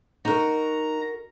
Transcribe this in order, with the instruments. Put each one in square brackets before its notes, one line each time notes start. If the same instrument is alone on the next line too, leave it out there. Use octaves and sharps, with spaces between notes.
[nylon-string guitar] D#4 [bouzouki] F#4 A#4 [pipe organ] A#5